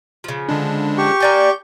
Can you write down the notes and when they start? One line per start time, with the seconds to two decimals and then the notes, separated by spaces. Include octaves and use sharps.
0.24 C#3 F3
0.49 D3 G#3 D4
0.98 G4 C#6
1.20 A#3 D5 G#5 G6